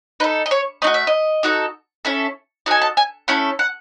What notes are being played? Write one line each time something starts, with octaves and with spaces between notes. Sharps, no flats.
D#4 A4 B4
D#5
C#5
A3 D#4 F#4 D#5
E5
D#5
D#4 F#4 A4
C#4 E4 A4
D#4 F#4 A4 G#5
A5
G#5
A3 C#4 E4 A4 F#5
F#5